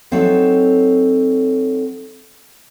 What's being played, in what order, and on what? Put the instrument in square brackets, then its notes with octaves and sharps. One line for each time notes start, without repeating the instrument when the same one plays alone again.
[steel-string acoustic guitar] F#3 C4 D#4 A4 C#5